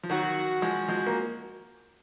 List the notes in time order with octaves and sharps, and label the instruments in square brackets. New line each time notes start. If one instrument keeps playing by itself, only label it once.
[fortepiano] F3
[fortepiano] D#3 F#3 [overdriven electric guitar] F#4
[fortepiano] F3 G#3
F3 G#3
A#3